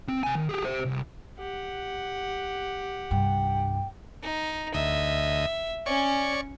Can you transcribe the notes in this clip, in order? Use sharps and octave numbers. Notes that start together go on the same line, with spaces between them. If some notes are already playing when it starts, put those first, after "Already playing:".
C4
C3 G#5
D#3
G4 G#4
G4 C5
C2
G4 F#5
C2 G2 G5
D#4
D2 D#5 E5
C#4 C#5 D5 C#6